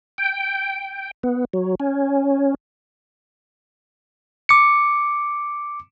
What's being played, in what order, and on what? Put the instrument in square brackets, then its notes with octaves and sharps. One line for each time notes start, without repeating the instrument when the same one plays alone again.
[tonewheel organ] G5
B3
F#3
C#4
[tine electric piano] D6 C#7